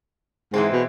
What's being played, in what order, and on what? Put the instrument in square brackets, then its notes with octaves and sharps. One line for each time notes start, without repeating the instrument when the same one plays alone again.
[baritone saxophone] G#2 [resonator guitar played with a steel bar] E3 G#3 C4
[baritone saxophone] B2